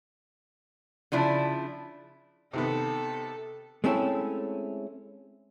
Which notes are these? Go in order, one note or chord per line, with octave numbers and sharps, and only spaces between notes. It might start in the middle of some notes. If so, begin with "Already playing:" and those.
C#3 F3 D4 E4
C3 D#3 B3 A4
G#3 A3 C4 C#4 E4 A4